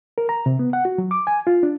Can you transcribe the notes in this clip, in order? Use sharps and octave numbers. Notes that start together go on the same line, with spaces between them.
A#4
A#5
C3
B3
F#5
F#4
F#3
D6
G#5
F4
D4